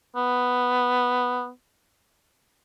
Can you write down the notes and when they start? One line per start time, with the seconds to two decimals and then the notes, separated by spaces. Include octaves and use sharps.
0.16 B3